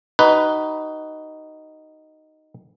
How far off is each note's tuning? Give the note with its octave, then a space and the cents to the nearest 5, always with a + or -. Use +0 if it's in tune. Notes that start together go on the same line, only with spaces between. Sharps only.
D#4 +0 F#4 +45 B4 +0